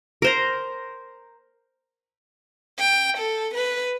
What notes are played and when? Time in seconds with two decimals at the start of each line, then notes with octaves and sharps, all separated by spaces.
0.22 A#4 C5 A#5
2.79 G5
3.17 A4
3.54 B4